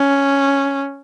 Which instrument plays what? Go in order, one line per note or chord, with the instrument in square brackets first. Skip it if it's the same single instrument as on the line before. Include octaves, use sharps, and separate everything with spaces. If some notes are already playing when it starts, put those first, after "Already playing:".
Already playing: [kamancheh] C#4